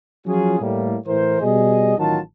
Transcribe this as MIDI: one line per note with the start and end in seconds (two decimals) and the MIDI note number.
0.26 0.58 53
0.26 0.58 54
0.26 0.58 61
0.26 0.58 65
0.26 0.58 66
0.26 0.58 68
0.60 0.97 45
0.60 0.97 55
0.60 0.97 58
1.07 1.37 45
1.07 1.37 52
1.07 1.37 70
1.07 1.37 72
1.41 1.96 47
1.41 1.96 55
1.41 1.96 68
1.41 1.96 75
1.98 2.19 33
1.98 2.19 51
1.98 2.19 54
1.98 2.19 65
1.98 2.19 81